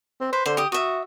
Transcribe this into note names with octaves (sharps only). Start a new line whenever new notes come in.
C4
B4 C5
D3 C5
G4 D#6
F#4 E5 D#6